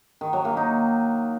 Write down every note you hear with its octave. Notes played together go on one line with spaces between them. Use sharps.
D#3
F#3
A#3
D#4